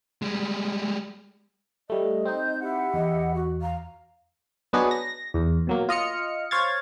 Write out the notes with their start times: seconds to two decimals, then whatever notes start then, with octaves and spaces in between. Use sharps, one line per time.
0.22 G3 G#3
1.90 G3 A3 D#5
2.26 C4 D#4 G6
2.61 E4 G4 F#5
2.94 E2 D#5
3.35 F#4
3.62 F5 A#5
4.73 F#3 B3 D4 D#4 F#4 G#4
4.91 A#6
5.34 E2
5.67 B2 F#3 A#3
5.89 F4 D#5 F6 C#7
6.51 C5 C#5 F5 G#6 A6